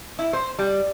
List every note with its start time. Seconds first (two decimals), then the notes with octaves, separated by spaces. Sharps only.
0.19 E4
0.33 C5
0.59 G3